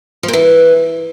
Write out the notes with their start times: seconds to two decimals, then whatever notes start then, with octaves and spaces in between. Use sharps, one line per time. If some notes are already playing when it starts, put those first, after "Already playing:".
0.23 F3
0.28 A#2
0.33 E3